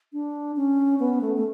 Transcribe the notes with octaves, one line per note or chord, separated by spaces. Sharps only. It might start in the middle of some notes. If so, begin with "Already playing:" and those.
D4
C#4
B3
A3
A3